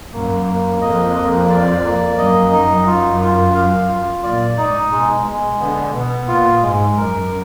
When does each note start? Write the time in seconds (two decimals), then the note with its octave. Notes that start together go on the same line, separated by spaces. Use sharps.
0.13 F#2 A#3
0.46 A#3
0.81 F2 D#5
1.15 A#3
1.49 D5
1.84 A#3
2.17 F#2 D#5
2.52 D#4
2.86 F4
3.20 F4
3.55 F5
3.89 F4
4.23 A#2 D5
4.57 G#2 D#4
4.91 B2 G#3
5.25 G#3
5.59 D3 B3
5.94 B2 B3
6.28 A#2 F4
6.62 G#2 G#3
6.96 F#2 A#4